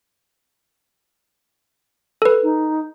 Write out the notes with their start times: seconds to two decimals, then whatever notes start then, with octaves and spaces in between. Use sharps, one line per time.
2.22 A4 B4
2.43 D#4